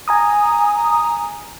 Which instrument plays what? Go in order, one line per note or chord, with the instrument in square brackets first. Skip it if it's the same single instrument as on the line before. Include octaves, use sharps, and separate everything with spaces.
[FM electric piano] G#5 A#5 D#6